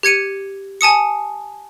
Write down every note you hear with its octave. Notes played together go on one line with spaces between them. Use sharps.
G4 G#6 C#7 D#7
G#5 A5 D#6 C#7